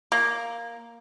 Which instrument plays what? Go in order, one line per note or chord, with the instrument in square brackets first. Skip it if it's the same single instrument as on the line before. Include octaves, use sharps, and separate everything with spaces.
[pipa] A#3